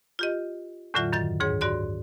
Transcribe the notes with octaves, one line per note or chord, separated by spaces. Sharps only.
F4 G4 D#5
E2 A2 D3 F#3 F4 E5
F#2 D#3 G6 A6
D2 G#2 G#4 C#5
G2 F#4 D5 C6